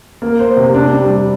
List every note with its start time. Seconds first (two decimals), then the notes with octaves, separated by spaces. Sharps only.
0.22 A#3
0.39 C5
0.57 C3
0.75 D4
0.92 G3
1.10 G3